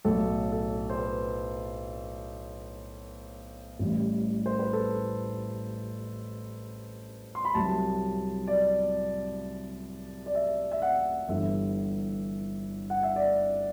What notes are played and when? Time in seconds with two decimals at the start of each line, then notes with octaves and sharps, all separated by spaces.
0.05 B1 A2 F#3 A4
0.52 A4
0.89 C5
0.99 B4
3.79 A1 A2 G3
4.46 C5
4.59 B4
4.73 A4
7.35 C6
7.45 B5
7.55 C2 C3 F#3 A5
8.47 D5
10.26 D5
10.35 E5
10.72 E5
10.82 F#5
11.29 G1 G2 E3 E5
12.90 F#5
13.03 E5
13.16 D5